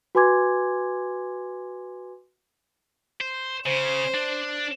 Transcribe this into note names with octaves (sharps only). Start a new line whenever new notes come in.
F#4 B4 G#5 C6 D6 G#6
C5
C#3 C5
D4